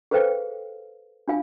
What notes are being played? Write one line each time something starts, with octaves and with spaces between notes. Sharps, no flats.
G#4 A4 B4 C5 F5 G5
D4 F4 F5 G#5